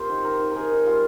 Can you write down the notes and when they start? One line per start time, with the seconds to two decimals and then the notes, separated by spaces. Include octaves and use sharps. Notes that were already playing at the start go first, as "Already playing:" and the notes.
Already playing: A#3 C4 F4 G4 C5
0.09 D#3
0.24 D#3 A#4
0.39 D#3
0.51 D#3 G#4 A#4
0.71 D#3
0.86 G3 F4